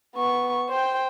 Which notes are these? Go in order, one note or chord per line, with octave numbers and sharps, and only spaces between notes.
B3 C#6
C5 G5